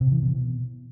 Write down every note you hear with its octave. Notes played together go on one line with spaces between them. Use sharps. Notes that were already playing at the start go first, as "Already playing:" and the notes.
C3
E3
B2